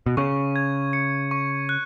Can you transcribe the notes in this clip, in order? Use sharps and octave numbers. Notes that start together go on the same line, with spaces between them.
B2
C#3 C#6
G#6
C#7
C#6
F#6